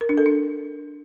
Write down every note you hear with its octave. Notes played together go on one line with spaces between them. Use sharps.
A#4
D4
A4
D4